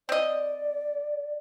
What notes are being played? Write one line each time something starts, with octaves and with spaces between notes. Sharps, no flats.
C4 D5 D#5